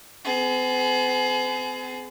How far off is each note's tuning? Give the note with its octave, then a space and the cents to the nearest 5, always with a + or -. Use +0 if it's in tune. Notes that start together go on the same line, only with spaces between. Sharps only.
C4 -45 G#4 +30